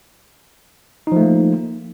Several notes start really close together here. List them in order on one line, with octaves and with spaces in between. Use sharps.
D#4 F3 A3 A#3